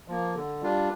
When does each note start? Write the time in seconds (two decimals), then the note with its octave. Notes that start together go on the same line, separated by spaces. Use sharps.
0.08 F3 A#3
0.35 D3
0.62 G3 D4 F4